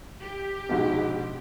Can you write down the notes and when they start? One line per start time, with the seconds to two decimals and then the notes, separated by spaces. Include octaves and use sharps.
0.21 G4
0.69 A#1 G#2 B2